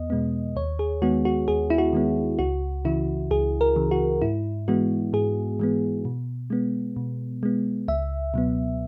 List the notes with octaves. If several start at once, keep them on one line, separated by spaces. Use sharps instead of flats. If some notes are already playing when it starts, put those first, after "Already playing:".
Already playing: E2 B3 D#5
B2 G#3 B3
D#2 C#5
G#4
D#3 G#3 B3 F#4
F#4
D#2 G#4
E4
F#4
D#3 G#3 B3
C#2 F#4
C#3 E3 E4
C#2 G#4
A#4
C#3 E3
F#4
G#2 E4
E3 G#3 B3 F#4
G#2 G#4
E3 G#3 B3
B2
G#3 B3
B2
G#3 B3
C#2 E5
B2 F#3 B3